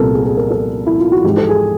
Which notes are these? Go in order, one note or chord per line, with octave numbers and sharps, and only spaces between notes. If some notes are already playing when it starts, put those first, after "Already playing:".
Already playing: C2 A#2 G3 B3 A4 A#4
G#4
G#4
A#4
A4
E4
F4
F#4
G#2 E3 G#3 G4
A4
G#4